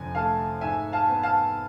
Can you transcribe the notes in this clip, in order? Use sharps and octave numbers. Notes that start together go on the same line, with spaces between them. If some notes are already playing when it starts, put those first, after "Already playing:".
Already playing: F1 F2 D3 G#5
A3 F5 A5
G#2 E5 G#5
F5 A5
B3
F5 A5